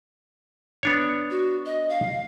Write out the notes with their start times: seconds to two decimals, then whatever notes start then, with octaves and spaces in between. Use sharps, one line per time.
0.83 B3 D4 C#5
1.30 F#4
1.66 D#5
1.89 F5